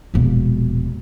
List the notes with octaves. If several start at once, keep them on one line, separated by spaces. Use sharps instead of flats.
E1 A#1